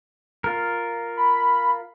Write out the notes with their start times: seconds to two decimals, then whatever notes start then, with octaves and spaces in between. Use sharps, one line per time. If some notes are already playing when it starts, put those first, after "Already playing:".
0.44 F4 A#4
1.17 B5